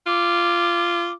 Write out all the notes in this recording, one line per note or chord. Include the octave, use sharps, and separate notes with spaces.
F4 D6